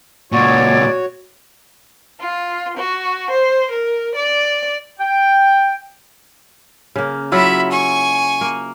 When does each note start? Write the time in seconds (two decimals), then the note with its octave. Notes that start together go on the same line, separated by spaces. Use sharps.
0.32 C#2 A#2 F#4 C#5 D5
2.21 F4
2.78 F#4
3.32 C5
3.72 A#4
4.16 D5
5.00 G5
6.96 C#3 A#3
7.32 F#3 E4 F4 E5 B5
7.71 G#5 C#6
8.41 A#3